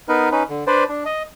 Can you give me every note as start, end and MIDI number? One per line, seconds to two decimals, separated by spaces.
0.09 0.29 59
0.09 0.29 63
0.09 0.29 70
0.09 0.29 71
0.32 0.43 61
0.32 0.43 63
0.32 0.43 71
0.49 0.64 50
0.67 0.84 62
0.67 0.84 71
0.67 0.84 72
0.67 0.84 74
0.89 1.03 62
1.05 1.23 75